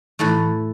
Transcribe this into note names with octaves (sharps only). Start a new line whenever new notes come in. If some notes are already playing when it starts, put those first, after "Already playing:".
A2 E3 A3 A4